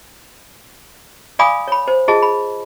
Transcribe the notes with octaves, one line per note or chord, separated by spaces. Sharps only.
D5 F5 G#5 B5 D6 D#6
C#5 B5
C5
F4 G#4 D#5 A5
B5